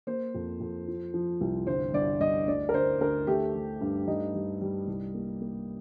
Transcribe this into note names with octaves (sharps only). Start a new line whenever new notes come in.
A#3 C5
F2
F2
F3
F3
C2
G1 C5
G1 D5
G1 D#5
D2 D5
A#4
D2 C5
D2 A#4
A3 G4
A3
G2
G3 D#4
G3
G3
C2
A#3
A#3